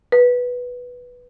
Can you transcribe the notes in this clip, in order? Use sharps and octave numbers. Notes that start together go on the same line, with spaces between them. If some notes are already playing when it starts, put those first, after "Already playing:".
B4